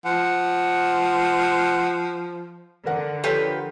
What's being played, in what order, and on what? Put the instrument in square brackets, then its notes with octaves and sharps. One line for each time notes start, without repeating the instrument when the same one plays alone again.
[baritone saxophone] F3 [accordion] F#5
[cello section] D3 [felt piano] A#4 F#5
[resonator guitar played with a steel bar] F3 G4 B4 [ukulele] F4 A4 C#5